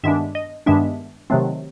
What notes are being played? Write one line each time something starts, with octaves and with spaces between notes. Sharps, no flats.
G2 D#3 G#3 B3 D4 E5
D#5
G2 D#3 G#3 B3 D4 E5
C3 D#3 F#3 A3 C4